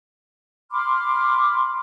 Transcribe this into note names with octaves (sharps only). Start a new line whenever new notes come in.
B5 C6 D6 F6